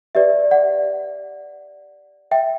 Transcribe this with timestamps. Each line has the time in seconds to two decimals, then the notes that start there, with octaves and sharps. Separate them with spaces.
0.15 G4 B4 D5 E5
0.51 D5 F#5
2.31 E5 G5